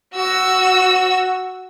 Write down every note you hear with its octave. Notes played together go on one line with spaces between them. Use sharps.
F#4 E6